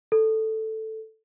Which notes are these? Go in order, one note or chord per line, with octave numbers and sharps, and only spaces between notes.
A4